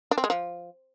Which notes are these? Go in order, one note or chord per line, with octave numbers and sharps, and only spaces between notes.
D4
C4
G#3
F3